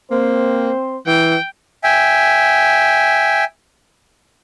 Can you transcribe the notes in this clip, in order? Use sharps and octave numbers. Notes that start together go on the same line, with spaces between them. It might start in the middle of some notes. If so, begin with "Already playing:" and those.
A#3 C4 C5
E3 G5
E5 G5 G#5